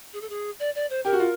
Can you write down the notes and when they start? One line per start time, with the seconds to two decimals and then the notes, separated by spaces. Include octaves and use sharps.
0.13 G#4
0.21 A4
0.29 G#4
0.59 D5
0.75 D5
0.90 C5
1.05 G4 A#4
1.13 F#4
1.20 F4